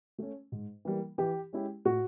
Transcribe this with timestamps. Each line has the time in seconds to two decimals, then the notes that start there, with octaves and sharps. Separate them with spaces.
0.18 A3 C#4
0.52 G#2
0.85 E3 G3 A#3
1.18 E3 G4
1.53 G#3 C#4 E4 G4
1.85 A2 F#4